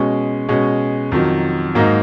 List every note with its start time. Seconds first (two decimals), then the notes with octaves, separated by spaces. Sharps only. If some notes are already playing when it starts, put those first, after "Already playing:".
Already playing: B2 G#3 C#4
0.49 B2 G#3 C#4
1.12 F2 D#3 F#3
1.75 G#2 F#3 A#3 D#4